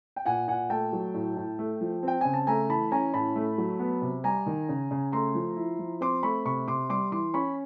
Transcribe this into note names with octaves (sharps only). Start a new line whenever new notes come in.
G5
A#2 F#5 G#5
A#2 F#5 G#5
A3 G5 A5
F#3
A2
A2
A3
F3
C4 G5
C#3 G#5
A5
A3 G#5 A#5
E3 A5 B5
C#4 G#5 A#5
A2 A5 B5
A3
F#3
B3
C3
G3 G#5 A#5
D#3
C#3
C#3
A3 A#5 C6
F3
E4
F3
C4 C6 D6
A3 B5 C#6
C3 B5 C#6
C3 C6 D6
G3 C6 D6
E3 C6 D6
C#4 B5 C#6